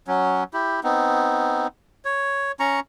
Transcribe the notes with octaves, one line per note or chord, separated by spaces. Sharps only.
F#3 C#4
E4 G4
B3 C4 D#4
C#5
C#4 A#5 C#6